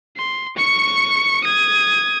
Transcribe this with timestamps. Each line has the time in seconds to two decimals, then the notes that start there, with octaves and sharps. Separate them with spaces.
0.17 C6
0.57 C#6 C#7
1.44 D#6 G#6